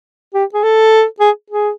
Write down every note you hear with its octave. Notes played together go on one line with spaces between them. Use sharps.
G4
G#4
A4
G#4
G#4